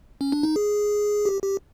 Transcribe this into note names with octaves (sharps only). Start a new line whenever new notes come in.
C#4
D4
D#4
G#4
G4
G4